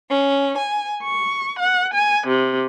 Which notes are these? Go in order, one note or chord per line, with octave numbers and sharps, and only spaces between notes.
C#4
G#5
C#6
F#5
G#5
C3